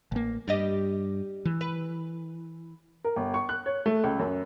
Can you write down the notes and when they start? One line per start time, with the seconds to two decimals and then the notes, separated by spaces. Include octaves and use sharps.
0.12 A1 A#3
0.48 G2 G3 G4 D#5
1.45 E3
1.61 B4
3.04 A#4
3.16 G1
3.34 C#6
3.49 F#6
3.66 C#5
3.86 A3
4.04 C#2
4.19 F#2